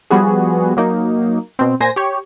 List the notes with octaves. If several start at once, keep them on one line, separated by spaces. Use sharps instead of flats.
F3 G3 B3 F#4 G#4
F#3 A#3 D#4
B2 C4
A#2 C5 G#5 A#6
G4 C#5